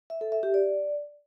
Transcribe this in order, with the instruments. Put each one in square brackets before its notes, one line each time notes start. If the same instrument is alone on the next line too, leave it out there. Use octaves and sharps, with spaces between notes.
[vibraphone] E5
A4
E5
G4
D5